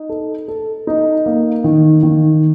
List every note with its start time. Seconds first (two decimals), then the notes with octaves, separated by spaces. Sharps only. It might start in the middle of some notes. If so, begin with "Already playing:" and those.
Already playing: D#4
0.09 A4
0.48 A4
0.87 D#4
1.26 A#3
1.64 D#3
2.03 D#3